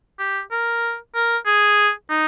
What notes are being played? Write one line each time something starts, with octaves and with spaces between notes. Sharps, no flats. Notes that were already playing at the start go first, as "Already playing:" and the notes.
G4
A#4
A#4
G#4
D#4